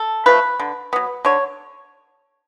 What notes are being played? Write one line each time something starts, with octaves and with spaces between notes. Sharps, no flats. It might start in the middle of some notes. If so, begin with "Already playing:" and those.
Already playing: A4
F3 A3 B4
D3
F#3 B3
D3 C#5